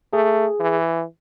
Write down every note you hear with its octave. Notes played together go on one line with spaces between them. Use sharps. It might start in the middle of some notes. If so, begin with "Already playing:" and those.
A3 G#4
E3